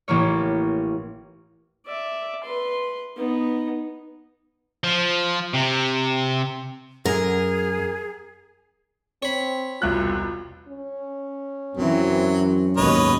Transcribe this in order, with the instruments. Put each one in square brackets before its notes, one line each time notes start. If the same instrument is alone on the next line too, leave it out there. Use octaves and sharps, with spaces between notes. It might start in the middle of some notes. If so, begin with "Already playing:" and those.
[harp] A1 E3 A#3 C#5
[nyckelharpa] D5 E5
B4 C6
B3 D#4
[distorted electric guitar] F3
C3
[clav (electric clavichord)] F#2 [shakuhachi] G#4 [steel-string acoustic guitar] A#4
[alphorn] C4 [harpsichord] C#5 B5
[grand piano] E1 C2 F#6 [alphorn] F4
[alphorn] C#4
[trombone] F#2 [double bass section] E3 C4 [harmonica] F#3
[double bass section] D#2 G#2 B2 [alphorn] C#4 [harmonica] B4 C#5 D#5